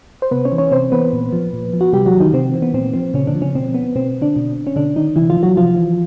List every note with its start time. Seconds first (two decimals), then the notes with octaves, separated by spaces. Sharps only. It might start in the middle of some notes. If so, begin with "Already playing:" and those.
0.22 C5
0.31 C3 B3 B4
0.45 C#4 C#5
0.52 E3
0.58 C#4 C#5
0.71 C3 C4 C5
0.92 E3 B3 B4
1.13 A#2
1.33 F3
1.53 A#2
1.73 F3
1.81 F#4
1.93 C3 G3 G4
2.06 F#3 F#4
2.13 E3
2.20 D#3 D#4
2.33 C3 C4
2.54 E3
2.62 B3
2.74 A#2 C4
2.94 F3 C4
3.14 A#2 C#3 C#4
3.27 D3 D4
3.35 F3
3.41 C#3 C#4
3.55 B2 C4
3.74 B3
3.95 B2 C4
4.21 D3 D4
4.36 B2
4.67 C#4
4.76 B2 D3 D4
4.96 D#3 D#4
5.16 C3 E3 E4
5.30 F3 F4
5.37 E3
5.43 F#3 F#4
5.56 C3 F3 F4
5.76 E3